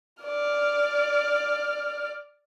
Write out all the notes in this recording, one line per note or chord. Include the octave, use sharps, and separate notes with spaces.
D5 F6